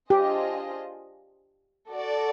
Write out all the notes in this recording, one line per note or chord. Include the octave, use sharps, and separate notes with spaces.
D4 F4 G4 G#4 C5 D#5
F#4 A4 D5